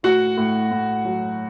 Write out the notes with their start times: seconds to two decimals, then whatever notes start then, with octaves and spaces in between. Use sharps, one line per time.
0.03 A2 F#4 F#5
0.37 A2
0.71 A2
1.05 F#3